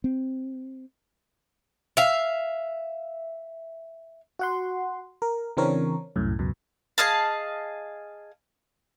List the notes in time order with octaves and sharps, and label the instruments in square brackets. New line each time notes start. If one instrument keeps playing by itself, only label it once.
[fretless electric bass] C4
[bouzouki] E5 F5
[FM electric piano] F#4 F#5 C6
A#4
C#3 E3 C4 D4 A#4 C#5
C2 F#2 A2
C#2 F#2 B2
[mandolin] G#4 D#5 F5 A5